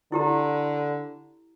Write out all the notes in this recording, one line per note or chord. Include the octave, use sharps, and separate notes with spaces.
D3 E4 G4 A#5